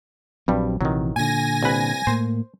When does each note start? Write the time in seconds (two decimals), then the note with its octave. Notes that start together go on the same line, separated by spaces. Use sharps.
0.48 A#1 G2 F#3 G3 C4
0.81 A#1 C3 D#3 E3 F#3
1.16 A#2 D3 G#5 A#6
1.63 C2 B4
2.07 A2 A#3 C5